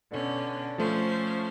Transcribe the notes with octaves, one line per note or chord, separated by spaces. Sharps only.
B2 D3 C#4
F3 A3 C#4 F4 C5